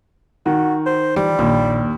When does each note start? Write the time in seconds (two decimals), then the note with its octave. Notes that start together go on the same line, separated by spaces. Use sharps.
0.46 D#3 F#4
0.86 C5
1.16 E3 F3 G3
1.39 A#1 D#2